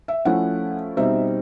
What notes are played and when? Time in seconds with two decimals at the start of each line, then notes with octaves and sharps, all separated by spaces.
0.08 E5
0.25 F3 A3 C#4 E4 F#5
0.97 B2 G3 C4 D#4 E5